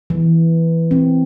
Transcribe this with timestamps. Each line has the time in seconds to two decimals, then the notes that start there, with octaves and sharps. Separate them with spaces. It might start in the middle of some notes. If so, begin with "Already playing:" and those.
0.10 E3
0.91 C4